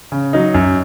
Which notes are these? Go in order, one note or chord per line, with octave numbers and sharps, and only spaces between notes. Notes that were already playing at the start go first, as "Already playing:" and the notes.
C#3
F#3 D#4
F#2